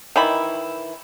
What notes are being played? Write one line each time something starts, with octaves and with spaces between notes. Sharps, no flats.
D#3 E3 E4 B5